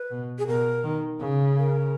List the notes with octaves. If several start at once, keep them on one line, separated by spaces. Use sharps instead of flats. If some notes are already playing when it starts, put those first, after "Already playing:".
Already playing: B4
B2
G#4
B2 A#4
D#3
C#3
A#4